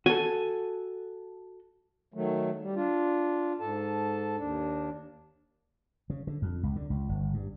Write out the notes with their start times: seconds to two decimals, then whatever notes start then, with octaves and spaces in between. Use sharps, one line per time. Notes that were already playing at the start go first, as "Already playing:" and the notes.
0.06 F#4 A4 G#5
2.14 D#3 F#3 A3
2.61 G3
2.75 D4 F4
3.60 G#2 A4 A5
4.37 D#2 D4
6.10 C#3
6.27 D3
6.42 F2
6.63 C#2
6.76 D3
6.90 C#2
7.09 G1
7.34 G2